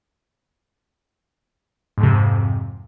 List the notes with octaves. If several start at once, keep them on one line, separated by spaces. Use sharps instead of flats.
F2 G#2 C3